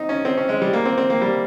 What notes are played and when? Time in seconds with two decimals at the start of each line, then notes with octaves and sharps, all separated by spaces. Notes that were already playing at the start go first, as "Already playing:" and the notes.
Already playing: C4 D#4
0.09 C#4
0.25 C4
0.37 C#4
0.49 G#3
0.62 G3
0.73 A#3
0.85 C4
0.98 C4
1.10 A#3
1.21 G3